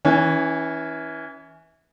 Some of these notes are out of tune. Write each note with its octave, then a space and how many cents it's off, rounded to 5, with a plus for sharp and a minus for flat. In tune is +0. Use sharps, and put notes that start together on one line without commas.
E3 -20 C#4 +5